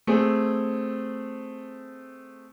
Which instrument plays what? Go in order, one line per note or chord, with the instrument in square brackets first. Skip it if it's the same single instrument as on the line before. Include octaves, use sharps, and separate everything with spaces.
[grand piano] A3 C4 G#4